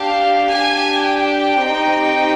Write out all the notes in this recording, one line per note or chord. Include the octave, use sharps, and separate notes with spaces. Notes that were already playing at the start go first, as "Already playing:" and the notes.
Already playing: D4 G4 F5
D4 G4 G#5
G5
C4 D#4 G4